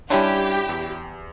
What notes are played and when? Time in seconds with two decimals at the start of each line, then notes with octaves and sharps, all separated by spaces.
0.10 D3 G3 C#4 D4 E4 G4
0.69 E2